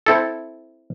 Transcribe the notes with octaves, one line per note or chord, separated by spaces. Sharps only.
C4 E4 A4